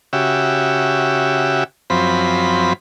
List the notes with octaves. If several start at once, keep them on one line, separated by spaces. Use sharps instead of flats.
C#3 F#4 G4 E5
F#2 F3 C4 B5